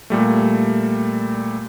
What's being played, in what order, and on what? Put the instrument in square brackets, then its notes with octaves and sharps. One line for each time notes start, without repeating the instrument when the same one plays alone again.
[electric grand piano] A#2 G3 A3